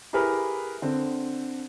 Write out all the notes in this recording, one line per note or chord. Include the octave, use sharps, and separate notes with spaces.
E4 G4 G#4 A#4 B4
D3 C4